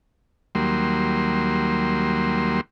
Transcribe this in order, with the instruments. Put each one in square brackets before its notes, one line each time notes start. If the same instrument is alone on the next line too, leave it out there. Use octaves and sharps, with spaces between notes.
[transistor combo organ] D#2 F#3 G3 A#3 C6